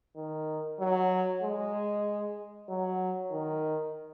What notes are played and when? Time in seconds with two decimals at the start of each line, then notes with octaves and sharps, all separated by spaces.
0.16 D#3
0.79 F#3
1.43 G#3
2.69 F#3
3.32 D#3